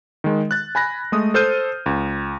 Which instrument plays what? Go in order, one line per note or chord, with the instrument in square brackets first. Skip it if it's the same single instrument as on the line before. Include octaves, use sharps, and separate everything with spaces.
[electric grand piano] D#3 G#3
F#6 A6
G#5 B5 F#6 A#6
G#3 A3 D#6
A4 C5 F6 G6 D#7
C#2